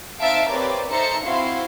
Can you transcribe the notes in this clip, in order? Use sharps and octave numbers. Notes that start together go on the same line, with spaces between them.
C4 D#4 E5 F5 A5 D7
C4 G4 A#4 B4 C#5 D5
D#4 A4 C5 E5 A#5 C#7
C4 E4 F#4 F5 C6